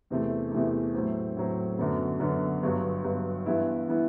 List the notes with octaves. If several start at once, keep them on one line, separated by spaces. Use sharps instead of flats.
E2 C3 E3 A3
E2 C3 E3 A3
A2 F#3 C4
A2 F#3 C4
F#2 D3 F#3 B3
F#2 D3 F#3 B3
G1 G2 F#3
G1 G2 F#3
G2 E3 B3 E4
E3 B3 E4